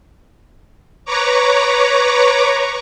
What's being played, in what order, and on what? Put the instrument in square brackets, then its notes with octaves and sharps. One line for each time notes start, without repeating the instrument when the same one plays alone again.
[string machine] B4 C#5 A#5 C#6 D6